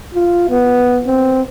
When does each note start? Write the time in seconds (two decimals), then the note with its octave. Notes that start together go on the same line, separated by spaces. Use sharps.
0.15 F4
0.50 B3
1.07 C4